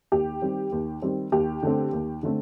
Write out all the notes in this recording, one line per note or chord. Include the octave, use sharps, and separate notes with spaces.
D#2 G4
D#3 G3 C4
D#2
D#3 G3 C4
D#2 G4
D3 A3 C4
D#2
D3 A3 C4